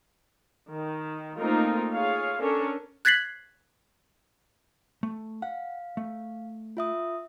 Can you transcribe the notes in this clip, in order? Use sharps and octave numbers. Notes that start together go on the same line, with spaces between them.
D#3
A3 A#3 C4 D#4 F4 A#4
F4 G#4 C#5 F5
C#4 D4 A4 A#4 C#5
F#6 G#6 A6 B6 C7 F#7
A3
F5 F#5
A3
F4 E5 D#6